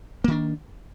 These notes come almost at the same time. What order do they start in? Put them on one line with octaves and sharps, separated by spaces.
A#3 D#3 D4